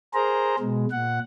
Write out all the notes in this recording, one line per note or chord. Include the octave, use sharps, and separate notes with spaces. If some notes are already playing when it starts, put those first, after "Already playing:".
G#4 A#4 C5 A#5
B2 G#3
A#2 F#5